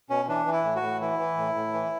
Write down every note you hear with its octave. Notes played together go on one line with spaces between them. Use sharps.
B2 C#4
E3 D4
E3
E4
A2
F#4
A2
E3 E4
E3
A2
A2
E3